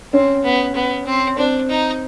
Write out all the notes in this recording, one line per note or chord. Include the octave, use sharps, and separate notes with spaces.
C4 C#4
B3
B3
C4
C4 D4
D#4